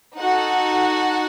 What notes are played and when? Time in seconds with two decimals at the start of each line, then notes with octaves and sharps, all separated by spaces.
0.16 D#4 F#4 A4 F#5